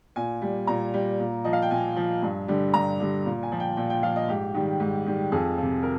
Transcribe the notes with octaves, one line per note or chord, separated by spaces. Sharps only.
A#2 G#5
G3
A#2 A#5
G3
A#2
F3 D#5
F5
G5
A#2 G#5
F3
G2
D3 G3
G2 A#5
D3 G3
A#2
G#5
F3
G5
A#2 G5
G5
F3 F5
D#5
G#2 G4
D#3 G3
G#2
D#3 G3
F2 G#4
F3
C3
A#4